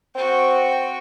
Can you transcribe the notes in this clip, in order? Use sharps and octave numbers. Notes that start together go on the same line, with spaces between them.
C4 F#4 G5